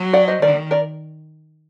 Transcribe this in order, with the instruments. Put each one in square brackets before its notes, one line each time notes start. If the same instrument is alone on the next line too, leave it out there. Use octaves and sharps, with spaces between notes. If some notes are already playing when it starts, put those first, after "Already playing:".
Already playing: [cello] F#3
[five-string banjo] D5 F#5
C5 D#5
[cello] D#3 [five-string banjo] A#4 D5
[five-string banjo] A#4 D5